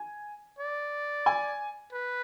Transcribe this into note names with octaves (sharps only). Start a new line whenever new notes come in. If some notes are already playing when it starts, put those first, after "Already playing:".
Already playing: G#5
D5
G#5
B4